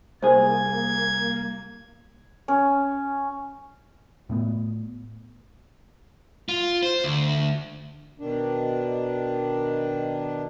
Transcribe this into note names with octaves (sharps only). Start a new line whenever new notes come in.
C2 A#3 G#4 C5 G#6
C#4
A2 A3 B3
F4
C5
D2
B2 D#3 D4